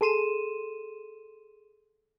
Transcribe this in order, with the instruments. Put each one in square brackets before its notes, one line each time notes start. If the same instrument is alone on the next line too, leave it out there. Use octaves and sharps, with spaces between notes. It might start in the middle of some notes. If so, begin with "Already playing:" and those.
[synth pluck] G#4 A4 C6 D#7 E7